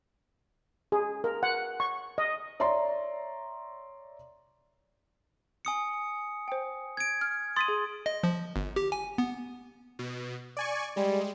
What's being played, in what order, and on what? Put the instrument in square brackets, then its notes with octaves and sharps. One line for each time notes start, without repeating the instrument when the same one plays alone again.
[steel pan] G#4
A#4
F#5
C#6
D#5
[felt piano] C#5 D5 E5 A#5 C6
[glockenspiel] G#5 D#6 C#7
[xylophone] C5 G5
[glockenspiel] G#6 D7
[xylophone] F6
[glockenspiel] C6 D#6 [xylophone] A6 B6 D#7
[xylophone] G#4
[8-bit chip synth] D#5
F3
G1
G4
G#5
B3
[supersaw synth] B2
D5 G#5 C#6
[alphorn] G3 [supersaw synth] G#3